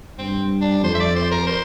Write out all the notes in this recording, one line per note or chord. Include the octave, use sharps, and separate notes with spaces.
G2 C4
D4
F2 C5
E5
D5
C5
A#4
C5